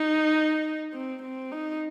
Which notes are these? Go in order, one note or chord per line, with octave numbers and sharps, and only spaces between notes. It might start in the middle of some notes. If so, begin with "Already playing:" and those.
Already playing: D#4
C4
C4
D#4